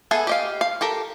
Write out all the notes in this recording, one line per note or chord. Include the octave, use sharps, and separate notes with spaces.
B3 G#4 A4 E5 G#5
G4 D#5 F5
F5
G4 A4 A#4